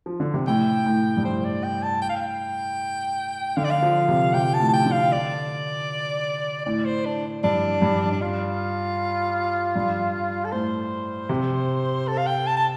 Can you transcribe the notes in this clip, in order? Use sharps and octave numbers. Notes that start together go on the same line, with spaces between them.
F3
D3
C3
A2 G5
A2
G2
A2 C5
D5
G5
A5
G5
F5
G5
D3 F5
D5
F5
F3
C3
C3 G5
A5
A2
A5
G5
D3
F5
D5
A2 D5
C5
D4
G2 D4
G2
D4
F4
G2
A4
A2 C5
C3
A4
F5
G5
A5
A5